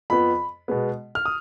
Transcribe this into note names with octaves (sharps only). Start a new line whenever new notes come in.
F2 F3 B3 B5
B2 G#3 B3
F6
D#6